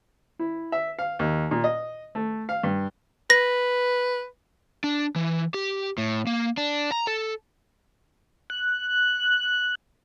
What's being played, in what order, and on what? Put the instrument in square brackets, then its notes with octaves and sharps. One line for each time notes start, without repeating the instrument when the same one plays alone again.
[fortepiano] E4
E5
F5
D#2
A#2
D#5
A3
F5
G2
[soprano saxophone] B4 [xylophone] A#6
[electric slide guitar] D4
E3
G4
A2
A#3
D4
A#5
A4
[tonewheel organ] F#6